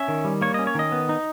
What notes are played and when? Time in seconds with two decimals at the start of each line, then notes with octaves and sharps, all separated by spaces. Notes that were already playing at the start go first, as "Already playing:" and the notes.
Already playing: C#4 E5
0.08 D#3
0.25 G3
0.41 A#3 C#5
0.54 D#5
0.59 C#4
0.67 C#5
0.75 D#3 D#5
0.92 B3
1.09 D#4